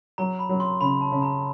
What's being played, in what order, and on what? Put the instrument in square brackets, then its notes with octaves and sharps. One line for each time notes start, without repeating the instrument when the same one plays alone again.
[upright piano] F#3 [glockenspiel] A#5
[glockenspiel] B5
[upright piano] F#3
[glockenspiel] C6
[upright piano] C#3 [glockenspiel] B5
[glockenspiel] A5
[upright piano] C#3
[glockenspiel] A#5